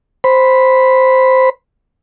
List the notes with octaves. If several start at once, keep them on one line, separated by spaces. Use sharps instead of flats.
C5 B5